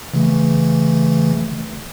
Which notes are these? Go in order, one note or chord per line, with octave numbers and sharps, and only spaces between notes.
C#3 E3 A3